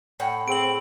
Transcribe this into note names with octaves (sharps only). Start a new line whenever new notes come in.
A2 F#5 G5
C4 G#4 D7 F#7